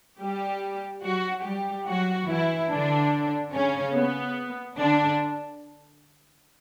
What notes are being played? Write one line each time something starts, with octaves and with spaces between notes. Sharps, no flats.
G3 G4
F#3 F#4
G3 G4
F#3 F#4
E3 E4
D3 D4
C#3 C#4
B3
D3 D4